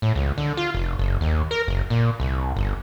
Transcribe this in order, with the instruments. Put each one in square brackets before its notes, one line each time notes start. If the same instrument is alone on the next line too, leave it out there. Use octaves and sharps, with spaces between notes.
[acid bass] A2
C#2
D3
F4
F1
F#1
D#2
A#4
F#1
A#2
C2
G1